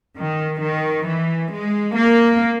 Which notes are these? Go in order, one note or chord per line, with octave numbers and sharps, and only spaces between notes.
D#3
D#3
E3
G#3
A#3